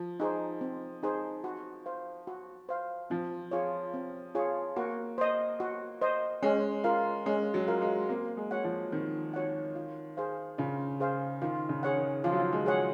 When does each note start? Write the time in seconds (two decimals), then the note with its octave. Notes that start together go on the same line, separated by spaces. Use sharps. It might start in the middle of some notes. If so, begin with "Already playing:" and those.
Already playing: F3
0.20 D#4 G#4 C5
0.61 C4
1.03 D#4 G#4 C5
1.44 F#4
1.86 C5 F5
2.27 F#4
2.69 C5 F5
3.10 F3 C4
3.51 F4 G#4 C#5
3.94 C4
4.35 F4 G#4 C#5
4.76 A#3 F#4
5.18 C5 D#5
5.60 F#4
6.01 C5 D#5
6.43 G#3 C#4
6.84 F4 A#4 F5
7.26 G#3 C#4
7.54 F#3
7.68 F4 A#4 F5
7.82 G#3
8.09 A#3 C4
8.37 G#3
8.51 F#4 C#5 F#5
8.64 F3
8.92 D#3 C4
9.34 F#4 C#5 F#5
9.75 F4
10.17 G#4 C5 F5
10.58 C#3 F4
11.00 G#4 C5 F5
11.42 D#3 F4
11.69 C#3
11.83 G#4 C#5 F#5
11.97 D#3
12.24 F3 F4
12.32 F#3
12.40 F3
12.53 G#3
12.66 G#4 C#5 F#5